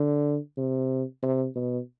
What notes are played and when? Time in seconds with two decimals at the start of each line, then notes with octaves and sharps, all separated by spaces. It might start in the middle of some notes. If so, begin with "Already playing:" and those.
Already playing: D3
0.58 C3
1.23 C3
1.56 B2